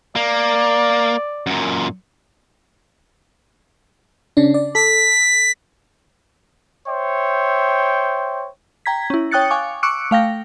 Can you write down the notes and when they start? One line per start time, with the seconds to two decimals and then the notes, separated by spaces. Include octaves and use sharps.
0.16 A#3 D5
1.47 F#2 A#2
4.37 C#3 C#4 D4
4.54 D5
4.75 A4 B6
6.88 C5 C#5 E5 G5
8.86 G5 A#5 G#6 B6
9.10 C#4 E4
9.31 C#5 G5 D#6 F#6 A6 C#7
9.51 F5 G#5 C#6 D6
9.83 C#6 D6 E6 F#6 C#7 D7
10.11 A3 F5 G5 A#6